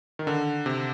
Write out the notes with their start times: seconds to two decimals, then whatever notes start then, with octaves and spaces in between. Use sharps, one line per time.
0.19 D#3
0.27 D3
0.66 C3